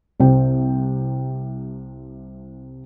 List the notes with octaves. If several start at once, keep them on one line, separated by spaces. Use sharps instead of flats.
C2 C3 C4 G5